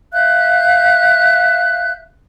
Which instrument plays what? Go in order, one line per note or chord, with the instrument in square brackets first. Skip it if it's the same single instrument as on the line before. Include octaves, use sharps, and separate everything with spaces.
[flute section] E5 F5 F#6 G6